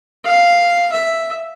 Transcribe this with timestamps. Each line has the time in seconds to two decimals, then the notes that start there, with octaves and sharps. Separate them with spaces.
0.25 F5
0.93 E5